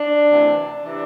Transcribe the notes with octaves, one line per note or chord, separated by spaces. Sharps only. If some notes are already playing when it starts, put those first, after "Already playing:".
Already playing: D4
D2 C3 E3
C3 E3 D4